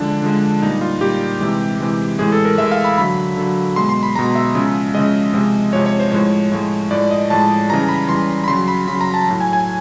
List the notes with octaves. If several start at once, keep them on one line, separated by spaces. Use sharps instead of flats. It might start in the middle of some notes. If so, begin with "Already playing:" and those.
Already playing: D3 F3 G#3 D4
D3 F3 G#3
A#2 G3 D#4
F4
A#2 G3 G4
C3 E3 G#3
C3 E3 G#3
A2 E3 G#3 G#4
A4
A#4
A2 E3 G#3 E5
F5
B5
D3 F#3 B5
D3 F#3
B2 G#3 C6
C6
B5
B2 G#3 A#5
E5
C#3 F3 G#3
C#3 F3 G#3 D#5
C3 F3 G#3
C3 F3 G#3 C#5
C#5
C5
A2 F3 G#3 C#5
A2 F3 G#3
A2 F3 G#3 D5
D#5
A2 F3 G#3 A5
C#3 E3 G3 A#5
B5
C#3 E3 G3 C6
B5
C#3 F#3 C6
B5
C#3 F#3 B5
A#5
A5
A2 F#3
G#5
G#5